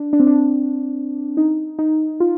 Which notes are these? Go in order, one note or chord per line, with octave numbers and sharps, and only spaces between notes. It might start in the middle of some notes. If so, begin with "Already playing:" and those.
Already playing: D4
D4
C4
D4
D#4
D#4
F4